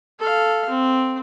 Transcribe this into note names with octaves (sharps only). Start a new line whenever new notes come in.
A4 F5
C4